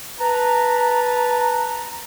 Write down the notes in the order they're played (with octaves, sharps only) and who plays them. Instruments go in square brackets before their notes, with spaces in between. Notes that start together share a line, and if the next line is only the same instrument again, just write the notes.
[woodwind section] B4 A5 A#5